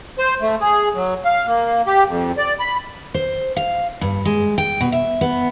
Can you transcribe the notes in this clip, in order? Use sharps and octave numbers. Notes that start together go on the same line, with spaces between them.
C5
A3
G#4
F#3
F5
A#3
G4
F2
D5
B5
C5
F5
G2
G#3
G5
B2
E5
B3